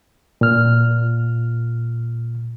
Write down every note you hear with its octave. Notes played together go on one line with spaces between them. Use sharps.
A#2 F6